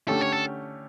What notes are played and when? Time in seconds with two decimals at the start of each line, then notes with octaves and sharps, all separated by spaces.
0.08 D3 A3 C#4 G4 A4
0.21 C#5
0.32 A4